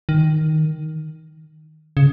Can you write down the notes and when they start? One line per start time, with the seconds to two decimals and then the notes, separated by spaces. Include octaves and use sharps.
0.09 D#3
1.97 C#3